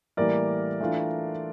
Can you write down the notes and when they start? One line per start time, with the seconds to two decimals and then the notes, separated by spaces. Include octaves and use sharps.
0.17 A2 E3 G3 A#3 A#4 D5
0.81 E3 A3 D4 F4